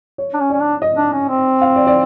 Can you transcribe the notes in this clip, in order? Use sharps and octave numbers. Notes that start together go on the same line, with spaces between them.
C#5
D4
C#4
C#4 D5
D4
D#5
D4
C#4
C4
F5
D5
D5